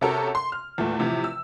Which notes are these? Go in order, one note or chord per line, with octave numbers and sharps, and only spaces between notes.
C3 C#4 F#4 A4 A#4
C6
F6
E2 A#2 A3
A2 C3 E3 F3
E6